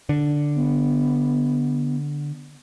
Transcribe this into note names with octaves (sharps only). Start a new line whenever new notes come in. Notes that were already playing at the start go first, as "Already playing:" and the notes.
D3
B3